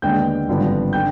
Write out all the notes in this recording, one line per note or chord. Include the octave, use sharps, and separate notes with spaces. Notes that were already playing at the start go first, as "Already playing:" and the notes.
D#2 D3 G#3 B3 D4 G5 G6
G#1 G2 D3 F3 B3
D3 G5 G6